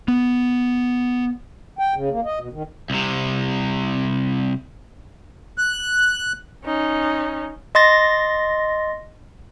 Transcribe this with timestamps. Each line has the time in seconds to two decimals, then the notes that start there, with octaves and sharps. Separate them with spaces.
0.08 B3
1.79 G5
1.94 C#3
2.10 A#3
2.25 D#5
2.40 B2
2.53 D#3
2.90 C2 C3
5.58 F#6
6.65 C#4 D#4
7.75 D#5 C6 A6 A#6